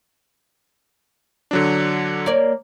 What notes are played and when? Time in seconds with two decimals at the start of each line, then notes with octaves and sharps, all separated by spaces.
1.51 D3 F#3 D4
2.26 A#3 C#5 D5